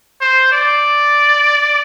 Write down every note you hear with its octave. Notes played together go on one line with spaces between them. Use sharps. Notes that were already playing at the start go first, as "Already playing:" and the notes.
C5
D5